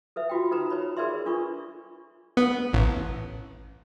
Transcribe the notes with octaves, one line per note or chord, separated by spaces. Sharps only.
A4 B4 E5
F4 F#4 G5
D#4 A4 B4 A#5
B4 C#5 B5
G#4 A#4 B4 D5 E5 C6
D4 F4 A4 C#6
B3
A1